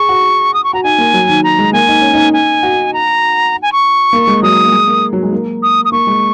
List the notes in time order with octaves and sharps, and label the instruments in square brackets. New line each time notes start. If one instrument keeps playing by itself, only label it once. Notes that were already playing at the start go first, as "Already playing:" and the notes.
Already playing: [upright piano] G#4 [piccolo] C#6
[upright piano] F#4
[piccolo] D#6
C#6
[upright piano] F#4 [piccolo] A#5
[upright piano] D#4 [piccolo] G#5
[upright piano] A#3
F#3
D#3
[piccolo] A#5
[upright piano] G#3
[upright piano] A#3 [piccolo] G#5
[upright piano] D#4
C#4
D#4
[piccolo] G#5
[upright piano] F#4
[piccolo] A#5
G#5
C#6
[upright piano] A#3
G#3
[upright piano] F#3 [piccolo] D#6
[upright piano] A#3
G#3
A#3
F#3
G#3
A#3
[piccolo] D#6
D#6
[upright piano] A#3 [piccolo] C#6
[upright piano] G#3